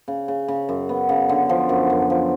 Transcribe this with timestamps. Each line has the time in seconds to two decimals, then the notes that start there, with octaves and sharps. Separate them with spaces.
0.08 C#3
0.28 C#3
0.48 C#3
0.69 F#2
0.89 B3
1.09 C#3
1.29 D3
1.49 F3
1.69 F#2
1.90 F#2
2.10 F3